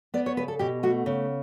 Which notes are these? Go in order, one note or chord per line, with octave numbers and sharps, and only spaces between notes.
B3 D5
C#5
C#3 B4
A4
B2 G4
A3 F#4
C#3